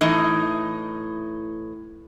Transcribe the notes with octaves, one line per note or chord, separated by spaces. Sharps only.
A2 E3 D#4 D#5